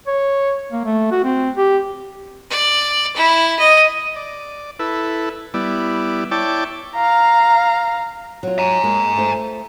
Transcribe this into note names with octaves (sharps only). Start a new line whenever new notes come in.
C#5
A#3
A3
F#4
C4
G4
D5
E4
D#5
D5
E4 A4 B4
G3 B3 E4 D5
E4 C#5 D5 G5 A5 D6
F5 A#5
F#3 F4
G#5 A#5
G#3 A#3
A3 F4 C5